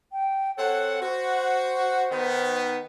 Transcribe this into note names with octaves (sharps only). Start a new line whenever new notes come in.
G5
C4 A4 C#5 F#5
F#4 C5
D#3 B3